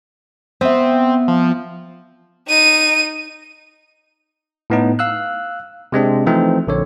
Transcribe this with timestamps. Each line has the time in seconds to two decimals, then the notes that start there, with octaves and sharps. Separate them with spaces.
0.61 B3 C4 E5
1.28 F3
2.48 D#4 D#7
4.70 A2 B3 D#4
4.99 F5 E6 F#6
5.92 C3 G#3 C4 D4
6.26 E3 F3 A3 C4 D#4
6.67 A#1 D3 C#5